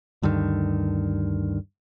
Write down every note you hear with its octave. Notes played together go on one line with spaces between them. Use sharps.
D2 G2 D3 D#3